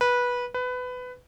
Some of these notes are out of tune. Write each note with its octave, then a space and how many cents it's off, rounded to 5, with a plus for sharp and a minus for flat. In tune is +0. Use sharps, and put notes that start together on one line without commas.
B4 -15
B4 +20